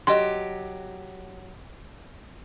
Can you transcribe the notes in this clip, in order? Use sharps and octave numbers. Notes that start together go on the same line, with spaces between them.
F#3 G4 D#5 C6